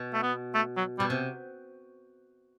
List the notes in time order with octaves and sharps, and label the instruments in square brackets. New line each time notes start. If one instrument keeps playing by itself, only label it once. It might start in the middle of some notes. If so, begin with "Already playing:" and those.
Already playing: [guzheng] B2
[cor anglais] A3
B3
A3
F#3
[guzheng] B2 [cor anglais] G3
[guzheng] C3